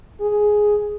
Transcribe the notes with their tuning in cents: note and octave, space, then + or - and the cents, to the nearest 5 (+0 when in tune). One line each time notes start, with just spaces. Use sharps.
G#4 +5